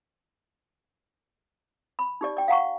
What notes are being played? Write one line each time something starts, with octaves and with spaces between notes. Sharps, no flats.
B5
D#4 G4 D5
D5 G5
F5 F#5 A#5 C#6